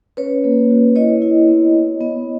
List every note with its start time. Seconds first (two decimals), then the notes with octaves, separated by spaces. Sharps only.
0.17 C#4 B4 C#5
0.44 A#3
0.70 F#4
0.96 E4 C#5 D#5
1.22 E4
1.48 B3
1.73 B3
2.01 B3